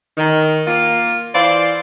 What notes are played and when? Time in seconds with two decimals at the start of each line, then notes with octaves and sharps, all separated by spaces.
0.17 D#3
0.67 A#3 F4
1.35 E3 C5 D5 F5